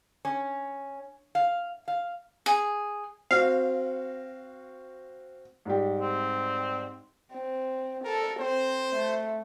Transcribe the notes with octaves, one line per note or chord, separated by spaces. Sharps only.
C#4
F5
F5
G#4
C4 F#4 F5
G#2 G3 G4
C4
C4
A4 A#4
C4 C5
A3